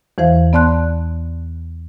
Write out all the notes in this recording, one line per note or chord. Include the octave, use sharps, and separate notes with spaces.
E2 E3 C5 F5
B3 D5 A5 C6 F#6